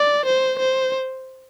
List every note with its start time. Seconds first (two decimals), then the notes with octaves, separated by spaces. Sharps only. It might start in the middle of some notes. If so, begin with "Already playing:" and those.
Already playing: D5
0.26 C5
0.59 C5